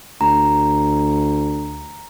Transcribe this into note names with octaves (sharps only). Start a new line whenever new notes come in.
D2 A#5